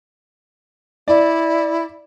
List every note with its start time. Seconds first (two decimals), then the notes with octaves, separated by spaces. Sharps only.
1.08 E4 D5